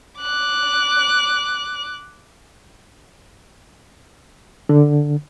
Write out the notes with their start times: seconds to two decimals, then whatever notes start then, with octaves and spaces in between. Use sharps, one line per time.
0.21 D6 F#6
4.69 D3